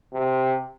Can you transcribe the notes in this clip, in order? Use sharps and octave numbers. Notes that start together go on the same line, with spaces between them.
C3